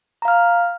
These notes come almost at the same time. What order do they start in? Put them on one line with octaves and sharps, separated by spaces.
A#5 F5 F6